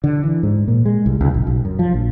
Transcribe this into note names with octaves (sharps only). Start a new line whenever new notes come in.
D3
E3
G#2
A#2
G#3
C2
C#2
A#1
B1
F#2
F3
A#1